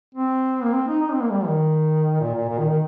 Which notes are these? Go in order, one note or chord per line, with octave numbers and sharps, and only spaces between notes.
C4
A#3
C4
D#4
D#4
C4
A#3
G3
D#3
A#2
A#2
A#2
D#3
D#3